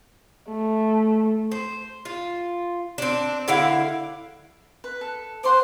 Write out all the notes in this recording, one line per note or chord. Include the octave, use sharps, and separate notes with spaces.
A3
C5
F4
C4 D4
D3 E4 F5 F#5
B4
A4
C5 F#5 C6 D6